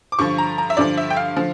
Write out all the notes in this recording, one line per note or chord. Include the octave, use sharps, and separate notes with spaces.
D6
G2 D3 F3 C#6
A#5
A#5
E5
G2 D3 F3 D5
E5
G5
F5
D3 F3